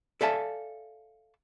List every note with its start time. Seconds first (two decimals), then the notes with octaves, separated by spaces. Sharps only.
0.21 A4 D5 E5 F5 G#5 A5